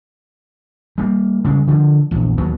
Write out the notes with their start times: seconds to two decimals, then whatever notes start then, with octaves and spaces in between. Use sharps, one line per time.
0.98 G3 A#3
1.45 C#3 G3 G#3
1.67 D3 F3
2.11 A#1 E2
2.38 D#2 B2 F#3